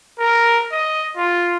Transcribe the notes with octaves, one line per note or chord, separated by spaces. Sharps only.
A#4
D#5
F4